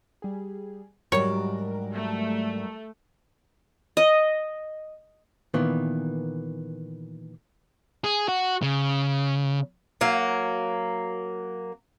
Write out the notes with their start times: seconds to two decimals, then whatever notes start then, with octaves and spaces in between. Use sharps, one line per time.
0.22 G3 G#4
1.12 G#2 F#3 G3 D4 A#4 C#5
1.94 A3
3.97 D#5
5.54 A#2 D#3 E3 B3
8.04 G#4
8.28 F#4
8.62 C#3
10.01 F#3 A#3